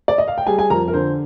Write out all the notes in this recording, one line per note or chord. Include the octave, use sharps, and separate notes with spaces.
D5
D#5
F5
G5
G3 G#4 G#5
G#4 G#5
F2 A#4 A#5
A#4
D3 C5